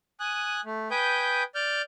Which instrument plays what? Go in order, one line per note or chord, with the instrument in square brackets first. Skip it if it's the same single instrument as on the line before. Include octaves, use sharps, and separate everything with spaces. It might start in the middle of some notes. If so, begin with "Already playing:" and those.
[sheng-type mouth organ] G#5 D#6 F#6
A3
B4 G5 G#5 D#6 G6
D5 F6 G6